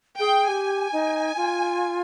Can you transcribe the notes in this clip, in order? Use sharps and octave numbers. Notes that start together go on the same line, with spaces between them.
G#4 G5
G4 G#5
D#4
F4